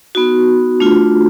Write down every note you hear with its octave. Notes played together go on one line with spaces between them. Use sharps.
B3 D#4 F#4
A3 D4 F4